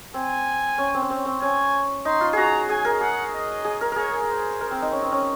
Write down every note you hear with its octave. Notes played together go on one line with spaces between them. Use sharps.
C4 G#5
C#4
C4
C#4
C4
C4
C#4 G#5
D#4 C6
F4
F#4 G#4 A#5
G#4 G#5
A#4
G#4 F#5
D#5
G#4
A#4
G#4 A#4 C#5
C5
A#4
C4
D#4
C#4
C4
C#4